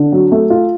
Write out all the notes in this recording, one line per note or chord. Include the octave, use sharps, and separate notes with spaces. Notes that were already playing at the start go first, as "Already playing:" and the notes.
Already playing: D3
F#3
A3
F4